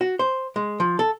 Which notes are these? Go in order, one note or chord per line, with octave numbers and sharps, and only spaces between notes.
F#4
C5
G#3
F3
A4